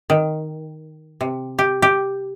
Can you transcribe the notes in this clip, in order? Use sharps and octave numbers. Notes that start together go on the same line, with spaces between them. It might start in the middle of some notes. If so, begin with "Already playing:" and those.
D#3
C3
G4
G4